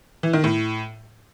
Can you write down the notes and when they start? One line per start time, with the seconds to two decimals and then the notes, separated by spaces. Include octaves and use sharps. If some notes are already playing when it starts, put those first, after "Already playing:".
0.23 E3
0.33 D#3
0.44 A2